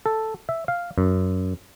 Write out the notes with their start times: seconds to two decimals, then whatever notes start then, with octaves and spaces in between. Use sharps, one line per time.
0.06 A4
0.49 E5
0.68 F5
0.98 F#2